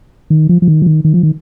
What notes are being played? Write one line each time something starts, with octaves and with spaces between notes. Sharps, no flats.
D#3
F3
F3
D#3
F3
D#3
D#3
F3
D#3